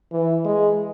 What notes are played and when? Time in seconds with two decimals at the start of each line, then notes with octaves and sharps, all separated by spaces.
0.12 E3
0.45 G#3